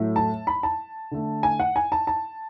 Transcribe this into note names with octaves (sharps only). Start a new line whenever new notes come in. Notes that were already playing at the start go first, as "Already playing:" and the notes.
Already playing: A2 F#3 A3
A5
B5
A5
D3 A3
G#5
F#5
G#5
A5
A5